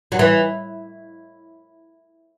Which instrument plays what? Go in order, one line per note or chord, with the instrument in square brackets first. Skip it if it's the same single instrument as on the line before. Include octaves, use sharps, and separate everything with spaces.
[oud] F#3
E3